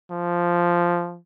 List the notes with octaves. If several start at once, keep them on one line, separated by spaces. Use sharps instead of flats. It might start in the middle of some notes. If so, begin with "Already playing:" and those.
F3